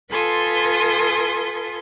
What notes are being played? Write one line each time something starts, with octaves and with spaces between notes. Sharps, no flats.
F4 A4 B4 G#5 C6 D#6